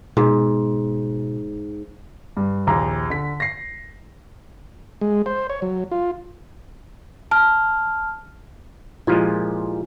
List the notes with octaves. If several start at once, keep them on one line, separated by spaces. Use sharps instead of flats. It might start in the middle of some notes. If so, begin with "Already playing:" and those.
G#2 B2
G2
A#1 D#2 A#5
D3 B6
A#6 C7
G#3
C5
C#5
F#3
F4
A5 F6
A#2 F3 G#3 E4 F4 G4